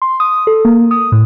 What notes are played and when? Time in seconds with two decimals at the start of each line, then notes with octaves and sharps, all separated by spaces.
0.02 C6
0.20 D#6
0.47 A4
0.65 A#3
0.91 D#6
1.12 A2